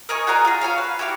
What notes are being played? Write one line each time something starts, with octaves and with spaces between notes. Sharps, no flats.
A#4 D#5 G#5 C#6
F#4 G#4 A#4 D5
F4 G#4
F#4 A4 C#5 F5
B4
E4 F#4 G4 F5